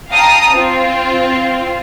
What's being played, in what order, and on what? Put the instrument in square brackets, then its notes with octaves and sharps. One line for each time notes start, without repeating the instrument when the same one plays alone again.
[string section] F5 G5 A5 A#5 D#6
C4 F4